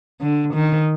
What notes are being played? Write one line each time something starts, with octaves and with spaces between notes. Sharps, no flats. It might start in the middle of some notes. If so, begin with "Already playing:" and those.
D3
D#3